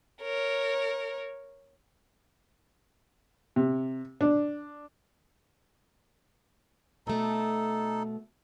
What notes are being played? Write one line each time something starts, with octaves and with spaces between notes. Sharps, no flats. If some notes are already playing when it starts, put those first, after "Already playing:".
A#4 C#5
C3
D4
B2 A3 D#4 A4